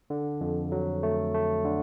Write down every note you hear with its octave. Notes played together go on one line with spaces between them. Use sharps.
D3
F2
F#3
A3
A3
D3